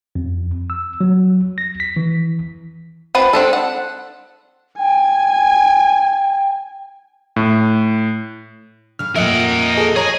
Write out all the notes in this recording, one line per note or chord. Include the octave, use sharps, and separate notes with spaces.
F2
E6
F#3
A#6
B6
E3
C4 F4 B4 F#5
C4 D4 A4
F#5
G5 G#5
A2
C#3 F5 F6
F2 A#2 A#4 D#5 E5 F#5
G#4 A4 D#5
G#4 C#5 G#5 A#5 G#6